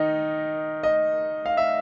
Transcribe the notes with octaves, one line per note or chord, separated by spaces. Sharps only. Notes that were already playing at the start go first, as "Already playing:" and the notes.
Already playing: D#3 D#4 D#5
D#5
F5
E5